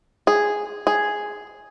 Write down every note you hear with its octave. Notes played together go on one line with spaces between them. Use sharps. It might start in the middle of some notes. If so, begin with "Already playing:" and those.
G#4
G#4